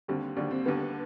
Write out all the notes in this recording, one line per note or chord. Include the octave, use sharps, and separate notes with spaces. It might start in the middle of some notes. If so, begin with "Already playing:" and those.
D#2 D3 G3 C4
D#2 D3 G3 D4
C4
D#2 D3 G3 B3